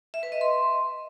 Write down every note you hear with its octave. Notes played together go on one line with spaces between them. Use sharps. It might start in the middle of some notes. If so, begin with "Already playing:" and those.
E5
B4
D#5
C6